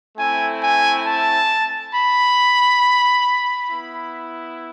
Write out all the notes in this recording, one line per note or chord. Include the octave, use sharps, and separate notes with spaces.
A3 C4 E4 G#5
G#5
A5
B5
B3 E4